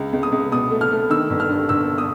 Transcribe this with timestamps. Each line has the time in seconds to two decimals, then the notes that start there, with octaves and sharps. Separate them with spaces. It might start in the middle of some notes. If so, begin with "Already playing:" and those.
Already playing: C#2
0.13 C#2
0.23 D#6
0.32 C#2
0.52 B2 D#6
0.71 A3
0.81 F6
0.92 A3
1.10 D#3 E6
1.30 G1
1.40 F6
1.49 G2
1.69 G1 E6
1.98 D#6